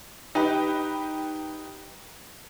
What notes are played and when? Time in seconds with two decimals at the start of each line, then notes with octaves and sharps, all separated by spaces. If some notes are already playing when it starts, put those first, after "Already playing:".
0.35 D#4 G4 B4